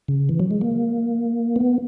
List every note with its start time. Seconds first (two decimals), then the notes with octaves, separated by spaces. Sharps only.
0.08 C#3
0.29 E3
0.40 F#3
0.51 G#3
0.61 A#3
1.56 B3